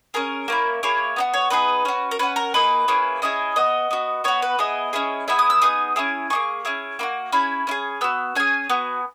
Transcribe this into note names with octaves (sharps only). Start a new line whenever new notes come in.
C#4 G#4 A#4
A#3 C#4 E4
A#3 E4 G#4 C#5
B3 D#4 F#4
C#5
B3 D#4 G#4 B4
C#4 F#4
A#4
C#4 F#4 B4
A#4
A#3 D#4 G#4 B4
A#3 C#4 E4 G#4
C#4 E4 G#4 D#5
B3 F#4 D#5
B3 F#4
B3 F#4 C#5
B4
B3 E4 G#4 D#5
C#4 E4 G#4
B3 E4 G#4 E5
D#6
E6
B3 D#4 G#4 D#6
C#4 E4 G#4
A#3 D#4 G#4 C#6
C#4 E4 G#4
A#3 D#4 F#4
C#4 E4 G#4 B5
C#4 E4 G#4
B3 F#4 E6
C#4 G#4 G#5
B3 F#4